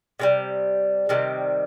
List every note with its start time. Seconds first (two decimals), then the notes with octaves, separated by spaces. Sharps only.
0.19 C3 D#3 G3
1.09 C3 D#3 G3